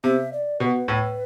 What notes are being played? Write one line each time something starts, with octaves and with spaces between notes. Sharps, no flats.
C3 E5
D5
B2 B4
A2